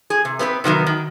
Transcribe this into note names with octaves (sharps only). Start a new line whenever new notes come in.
G#4
C3
B3 C4 A#4 B4
C3 D#3 F#3 B3
D#3